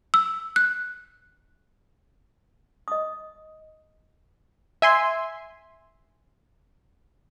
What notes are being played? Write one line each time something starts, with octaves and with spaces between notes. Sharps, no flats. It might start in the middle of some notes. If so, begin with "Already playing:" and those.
E6
F#6
D#5 D#6
E5 G#5 C6